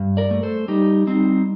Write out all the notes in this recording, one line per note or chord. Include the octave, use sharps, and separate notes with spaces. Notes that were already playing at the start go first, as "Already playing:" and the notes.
Already playing: G2
A#4 D5
A3
A4 C5
G3 D#4 G4
G3 C4 D#4